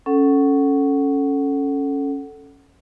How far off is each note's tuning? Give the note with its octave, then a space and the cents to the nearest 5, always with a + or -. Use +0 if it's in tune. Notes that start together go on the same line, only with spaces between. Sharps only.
C#4 +0 A4 +0 F#5 +15